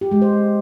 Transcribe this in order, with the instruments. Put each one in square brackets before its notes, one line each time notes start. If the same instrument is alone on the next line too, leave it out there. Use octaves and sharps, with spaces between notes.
[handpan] G4
G#3
C5